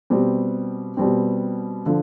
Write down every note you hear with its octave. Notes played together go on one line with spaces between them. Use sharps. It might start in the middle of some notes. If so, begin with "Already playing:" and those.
B2 G3 C4
B2 G3 C4
D3 F3